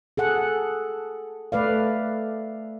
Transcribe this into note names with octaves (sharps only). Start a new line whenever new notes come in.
G#4 A4 F#5
A3 B4 D5 F5